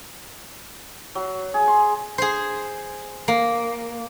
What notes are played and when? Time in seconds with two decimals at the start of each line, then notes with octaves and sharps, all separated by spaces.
1.15 F#3
1.54 G#4
1.68 C6
2.18 G#4 C5
3.28 A#3